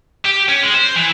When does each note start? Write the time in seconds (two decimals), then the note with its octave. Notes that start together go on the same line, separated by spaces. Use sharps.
0.25 G4
0.49 C#4
0.63 G#3
0.74 C5
0.97 E3